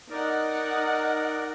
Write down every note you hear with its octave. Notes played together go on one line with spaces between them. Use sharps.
D#4 A#4 D5 F#5